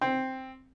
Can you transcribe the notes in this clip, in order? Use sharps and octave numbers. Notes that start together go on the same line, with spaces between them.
C4